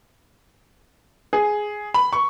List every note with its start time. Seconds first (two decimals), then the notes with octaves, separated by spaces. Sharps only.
1.33 G#4
1.94 B5
2.13 C#6